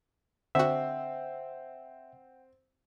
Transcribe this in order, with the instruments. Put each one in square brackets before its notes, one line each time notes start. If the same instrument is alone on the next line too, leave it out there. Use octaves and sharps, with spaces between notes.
[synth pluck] D3 F#4 [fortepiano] C4 [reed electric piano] E5 [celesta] F#5 G5